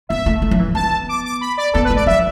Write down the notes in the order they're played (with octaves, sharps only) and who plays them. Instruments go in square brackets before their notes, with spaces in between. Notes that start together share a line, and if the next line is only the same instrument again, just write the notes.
[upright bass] B3 [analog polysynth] E5
[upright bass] A3
A3
F#3
E3
[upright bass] B3 [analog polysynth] A5
[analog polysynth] D6
D6
B5
D5
[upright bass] B3 [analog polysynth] A4
[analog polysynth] B4
[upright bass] A3
[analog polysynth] D5
[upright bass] F#3 [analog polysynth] E5